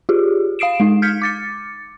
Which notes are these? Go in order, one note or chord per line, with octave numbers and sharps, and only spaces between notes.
F4 G4 G#4
F5 D#6 C7 D7 E7
G#3 D#4
F6 G6 G#6 B6 C#7
D6 A6 C#7